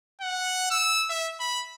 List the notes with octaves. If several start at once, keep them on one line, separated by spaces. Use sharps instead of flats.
F#5
E6
E5
B5